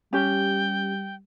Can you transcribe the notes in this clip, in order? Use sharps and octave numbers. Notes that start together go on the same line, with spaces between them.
G3 C#4 G4 G5